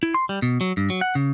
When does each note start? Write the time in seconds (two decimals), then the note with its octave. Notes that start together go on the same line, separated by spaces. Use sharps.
0.03 E4
0.14 C6
0.29 G3
0.42 B2
0.61 F#3
0.77 G2
0.90 F#3
1.01 F#5
1.15 C#3